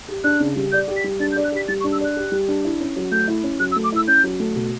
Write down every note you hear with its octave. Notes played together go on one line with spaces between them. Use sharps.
G4
D4 F#6
C#3
G3
D5 G6
G4
B6
G3
D4 A6
G6
D5
F#6
G4 B6
G3 A6
C#6
D4
E6
D5 F#6
G4
G3
D4
E4
C#4
F#3
A3 G6
E4
C#4
F#3 F#6
E6
A3
D6
E4 E6
C#4 G6
F#3
A3
B2